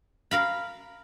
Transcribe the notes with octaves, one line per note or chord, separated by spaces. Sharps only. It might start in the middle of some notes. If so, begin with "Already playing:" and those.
A#4 F5 B5